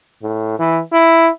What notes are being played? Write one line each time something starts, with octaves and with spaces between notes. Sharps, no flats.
A2
E3
E4